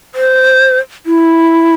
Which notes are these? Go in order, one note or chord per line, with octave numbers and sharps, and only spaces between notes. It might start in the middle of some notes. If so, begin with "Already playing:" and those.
C5
E4